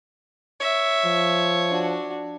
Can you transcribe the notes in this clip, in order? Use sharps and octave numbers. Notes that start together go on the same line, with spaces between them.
C#5 E5
F3
D4 F#4